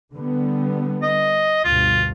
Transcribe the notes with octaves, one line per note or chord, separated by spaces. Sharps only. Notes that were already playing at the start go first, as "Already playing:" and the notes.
D3 G3 B3
D#5
D2 G2 B2 F4